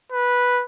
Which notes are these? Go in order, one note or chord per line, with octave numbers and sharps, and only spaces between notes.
B4